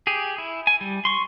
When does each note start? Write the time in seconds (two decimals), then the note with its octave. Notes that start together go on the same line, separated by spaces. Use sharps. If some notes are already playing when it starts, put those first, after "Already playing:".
0.07 G4 G#4
0.38 E4
0.67 G#5
0.81 G3
1.05 C6 C#6